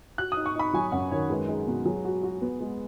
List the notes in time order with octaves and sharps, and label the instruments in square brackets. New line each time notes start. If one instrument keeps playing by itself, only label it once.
[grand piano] F#4 [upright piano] F#6
[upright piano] D#6
[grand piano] D#4
[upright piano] C#6
[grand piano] D#4 [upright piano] B5
[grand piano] F#3 [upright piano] G#5
[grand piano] F#2 [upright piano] F#5
[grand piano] D#3 [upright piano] C#5
[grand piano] G#3 [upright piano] B4
[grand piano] D#4 [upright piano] G#4
[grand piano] B2 [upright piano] F#4
[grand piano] F#3 [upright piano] G#4
[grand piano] F#4
F#4
B3
G#3